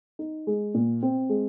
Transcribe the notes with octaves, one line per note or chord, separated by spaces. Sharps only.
D#4
G#3
A#2
C4
G#3